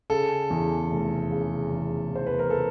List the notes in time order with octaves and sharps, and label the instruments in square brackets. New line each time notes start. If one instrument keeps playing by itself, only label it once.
[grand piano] C#3 A4
E2
F1
C#3
E2
E2
C5
B4
A#4
C#3 A4